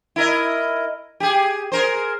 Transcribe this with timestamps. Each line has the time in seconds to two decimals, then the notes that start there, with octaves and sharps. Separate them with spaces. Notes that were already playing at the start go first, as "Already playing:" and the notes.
0.16 E4 A#4 D#5
1.20 G4 G#4
1.72 G#4 A#4 C5